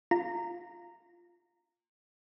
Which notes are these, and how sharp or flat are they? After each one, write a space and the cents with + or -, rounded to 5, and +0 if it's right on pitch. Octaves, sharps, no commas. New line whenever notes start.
F4 +0 A#5 -15